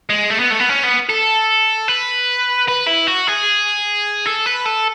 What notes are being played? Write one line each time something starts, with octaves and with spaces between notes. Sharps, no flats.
G#3
A3
B3
A3
B3
C#4
B3
A4
B4
B4
E4
F#4
G#4
A4
B4
A4